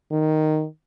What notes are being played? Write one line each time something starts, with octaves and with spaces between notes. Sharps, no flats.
D#3